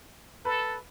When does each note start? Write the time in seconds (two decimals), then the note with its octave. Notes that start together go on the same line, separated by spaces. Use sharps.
0.45 A4 B4